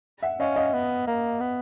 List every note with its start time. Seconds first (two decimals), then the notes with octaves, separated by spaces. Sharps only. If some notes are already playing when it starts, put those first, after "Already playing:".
0.23 E5 F#5
0.40 C#4 D#5 F5
0.56 D#5 F5
0.73 B3
1.07 A#3
1.40 B3